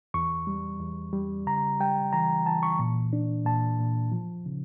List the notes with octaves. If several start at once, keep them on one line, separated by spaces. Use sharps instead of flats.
E2 C#6
G3
E2
G3
C#3 A#5
G3 G5
E3 A#5
E3 A5
C#6
A#2
D4
A#2 A5
A#2
F3
C#3